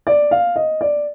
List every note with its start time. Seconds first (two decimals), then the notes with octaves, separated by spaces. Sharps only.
0.07 D5
0.31 F5
0.56 D#5
0.81 D5